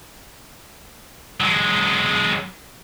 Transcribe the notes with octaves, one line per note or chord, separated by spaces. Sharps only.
F#3 G#3